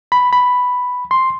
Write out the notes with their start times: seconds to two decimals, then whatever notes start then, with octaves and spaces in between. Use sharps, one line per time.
0.12 B5
0.33 B5
1.11 C6